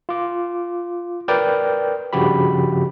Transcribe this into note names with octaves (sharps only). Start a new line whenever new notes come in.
F4 D6
A#4 B4 D5 G5
G2 C#3 F3 F#4 G4 B5